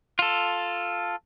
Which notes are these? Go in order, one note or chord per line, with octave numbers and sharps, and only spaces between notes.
F4 A4